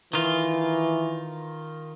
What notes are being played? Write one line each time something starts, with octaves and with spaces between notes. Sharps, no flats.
D#3 E3 F4